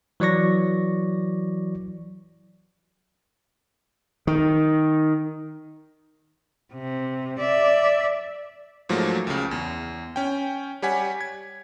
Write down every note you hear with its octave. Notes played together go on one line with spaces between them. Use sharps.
E3 F#3 D5 C#6 A#6
D#3
C3
D5 E5
G#2 F3 F#3 A3 A#3
C#2 C#3
E2
C#4 G5
G3 G4 C#5 F#5 G#5 B6
G#6